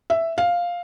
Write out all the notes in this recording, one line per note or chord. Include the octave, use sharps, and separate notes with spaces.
E5
F5